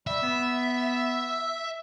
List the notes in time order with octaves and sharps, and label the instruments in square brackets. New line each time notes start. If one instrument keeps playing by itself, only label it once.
[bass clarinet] G3 [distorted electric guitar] E5
[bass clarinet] B3